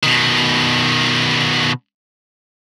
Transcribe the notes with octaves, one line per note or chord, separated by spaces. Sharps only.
B2 D#3